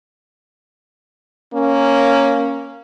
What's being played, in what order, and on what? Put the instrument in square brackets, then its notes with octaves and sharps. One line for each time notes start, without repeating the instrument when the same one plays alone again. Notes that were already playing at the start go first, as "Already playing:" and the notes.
[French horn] A#3 [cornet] C#4